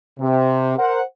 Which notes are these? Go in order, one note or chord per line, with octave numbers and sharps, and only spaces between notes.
C3
A#4 C5 F#5